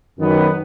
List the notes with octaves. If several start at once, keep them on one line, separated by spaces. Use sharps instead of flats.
F#2 D#3 F#3 B3